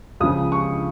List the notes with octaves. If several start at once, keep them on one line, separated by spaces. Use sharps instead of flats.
C#2 C#3 F3 D#6
C#6